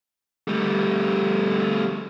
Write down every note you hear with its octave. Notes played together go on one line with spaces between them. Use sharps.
G3 A3